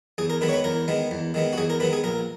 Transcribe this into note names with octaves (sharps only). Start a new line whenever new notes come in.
E2 G#4
A#4
D#3 G#3 B3 B4
C#5
B4
E2 A#4
D#3 G#3 B3
E2
D#3 G#3 B3
F#4
E2 G#4
A#4
D#3 G#3 B3 B4
G#4
A#1 A#4